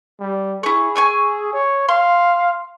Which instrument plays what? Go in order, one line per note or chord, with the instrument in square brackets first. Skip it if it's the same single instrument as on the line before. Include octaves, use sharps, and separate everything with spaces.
[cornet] G3
[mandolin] E4 C#6 [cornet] G#4
[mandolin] G#5 C#6 E6
[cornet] C#5
[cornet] F5 [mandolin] C6